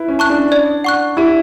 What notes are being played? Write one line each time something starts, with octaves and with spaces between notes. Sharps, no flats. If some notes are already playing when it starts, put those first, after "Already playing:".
Already playing: E4 B4
C#4
A5 C#6 F#6
D4
D5
F#5 C#6 F#6
E4 G4